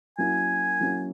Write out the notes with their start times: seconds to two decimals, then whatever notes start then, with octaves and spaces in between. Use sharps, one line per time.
0.18 F#3 A#3 C#4 E4 G#5
0.80 F#3 A#3 C#4 E4